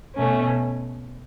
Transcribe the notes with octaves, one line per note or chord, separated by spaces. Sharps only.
B2 A3 C#4